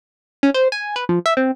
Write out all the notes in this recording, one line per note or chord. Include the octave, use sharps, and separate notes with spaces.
C#4
C5
G#5
B4
F3
E5
C4